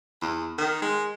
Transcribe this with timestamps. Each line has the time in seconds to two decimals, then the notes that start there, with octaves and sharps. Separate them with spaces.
0.22 E2
0.58 D#3
0.82 G#3